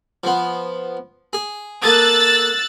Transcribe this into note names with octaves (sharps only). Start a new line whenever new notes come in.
F3 B3
G#4
A#3 A4 D#6 E6 F#6 A6